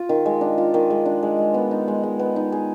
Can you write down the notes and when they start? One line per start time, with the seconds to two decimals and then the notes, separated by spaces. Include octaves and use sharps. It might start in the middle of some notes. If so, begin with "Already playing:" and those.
Already playing: F4
0.09 D#3
0.26 G#3
0.41 D4
0.58 F4
0.74 D#3
0.90 G#3
1.06 D4
1.23 G#3
1.38 G#3
1.54 B3
1.71 D#4
1.88 G#3
2.03 G#3
2.19 B3
2.36 D#4
2.52 G#4